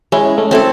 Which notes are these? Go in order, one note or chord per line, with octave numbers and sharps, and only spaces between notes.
G#3 C#4 E4
A3 C#4
A3 C4 E4 A4